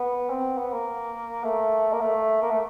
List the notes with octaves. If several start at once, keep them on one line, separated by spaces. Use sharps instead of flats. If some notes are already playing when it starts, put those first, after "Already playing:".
Already playing: B3
C4
B3
A#3
A3
A#3
A3
A#3
A3